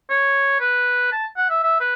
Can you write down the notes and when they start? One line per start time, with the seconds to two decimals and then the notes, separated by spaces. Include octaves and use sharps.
0.10 C#5
0.60 B4
1.12 A5
1.37 F#5
1.50 E5
1.63 E5
1.80 B4